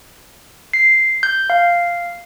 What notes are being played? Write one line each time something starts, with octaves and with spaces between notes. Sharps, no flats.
C7
G6
F5